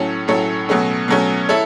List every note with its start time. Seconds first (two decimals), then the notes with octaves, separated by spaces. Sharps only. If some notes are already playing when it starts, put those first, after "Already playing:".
Already playing: A2 F#3 C#4 A4 C#5
0.28 A2 F#3 C#4 A4 C#5
0.69 B2 F#3 A3 C#4
1.08 B2 F#3 A3 C#4
1.49 E4 A4 C#5